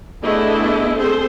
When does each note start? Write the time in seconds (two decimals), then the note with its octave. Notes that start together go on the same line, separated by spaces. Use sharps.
0.23 A3 B3 D4 E4 G#4 D#5
0.97 C4 G#4 A4 C5